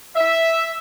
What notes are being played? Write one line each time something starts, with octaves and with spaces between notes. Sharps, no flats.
E5